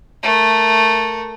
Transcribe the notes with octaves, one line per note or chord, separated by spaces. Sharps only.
A3 A#4